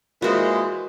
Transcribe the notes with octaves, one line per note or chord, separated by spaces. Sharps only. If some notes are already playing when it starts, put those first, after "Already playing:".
A#2 E3 G#3 F#4 C5